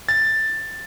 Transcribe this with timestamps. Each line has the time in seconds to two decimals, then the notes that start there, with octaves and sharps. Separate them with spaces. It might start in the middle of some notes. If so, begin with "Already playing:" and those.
0.09 A6